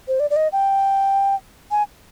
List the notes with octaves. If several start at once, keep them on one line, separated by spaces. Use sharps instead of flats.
C5
D5
D5
D#5
G5
G#5